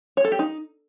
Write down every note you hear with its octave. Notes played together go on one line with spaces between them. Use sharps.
C#5
A4
G4
D#4